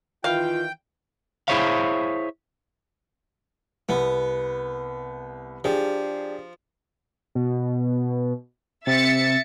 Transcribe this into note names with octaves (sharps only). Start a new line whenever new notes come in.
D#3 E3 F4 F5 G5
E4 G#4 C5 C#5 E5 F5
C2 B3
F3 D4 G4 G#4
B2
C3 E5 A6 C#7